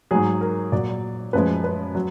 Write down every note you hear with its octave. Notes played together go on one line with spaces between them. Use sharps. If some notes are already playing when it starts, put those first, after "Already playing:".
G#2 F#3 G#4
A#4
A#2 F#3 D5
F#2 F3 G#3 B4
B4
F#3